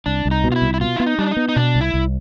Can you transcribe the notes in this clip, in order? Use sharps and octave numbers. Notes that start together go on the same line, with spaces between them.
C2 D4
C2
D#4
B2
F4
E4
C2
E4
B2 F4
B3 E4
D#4
G3 D4
D#4
B3
D#4
B2 D4
C2
E4
C2